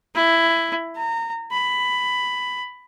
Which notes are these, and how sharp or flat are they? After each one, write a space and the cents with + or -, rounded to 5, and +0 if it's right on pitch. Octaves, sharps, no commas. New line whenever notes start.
E4 +10
A#5 -25
B5 +10